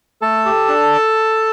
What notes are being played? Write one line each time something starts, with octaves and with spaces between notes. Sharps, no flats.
A3 A4 A5
G4
D4